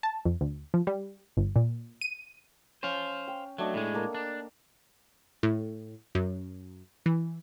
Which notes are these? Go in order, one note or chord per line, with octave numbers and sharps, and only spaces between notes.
A5
F2
D2
F3
G3
G1
A#2
D#7
C#4 C5 F5
G5
F#3 A3 D4 D#5
A2 G#3
A#3 A4
D4
A2
F#2
E3